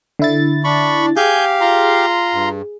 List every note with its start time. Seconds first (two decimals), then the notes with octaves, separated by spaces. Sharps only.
0.19 D3 E4 A6
0.64 D4 B5 C#6
1.17 G4 G#4 F5 G#5 G6
1.61 F4 A#5 C6
2.34 G2